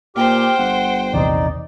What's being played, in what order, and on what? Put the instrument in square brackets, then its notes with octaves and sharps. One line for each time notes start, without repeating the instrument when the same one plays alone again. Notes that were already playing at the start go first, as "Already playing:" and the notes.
[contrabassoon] A#2 [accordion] G4 D6 F6 [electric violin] C5 G5
[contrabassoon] G1 [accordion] F#5
[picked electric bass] A#1 E2 C3 [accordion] D#4 D5